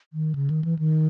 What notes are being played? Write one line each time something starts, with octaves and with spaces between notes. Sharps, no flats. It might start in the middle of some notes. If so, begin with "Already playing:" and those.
D#3
C#3
D#3
E3
D#3